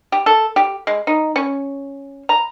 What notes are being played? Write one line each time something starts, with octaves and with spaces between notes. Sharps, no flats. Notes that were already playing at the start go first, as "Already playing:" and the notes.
G4
A4
G4
G#3
D#4
C#4
A#5